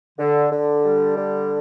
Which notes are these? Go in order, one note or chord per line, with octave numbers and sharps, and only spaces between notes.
D3
D3
G3
D3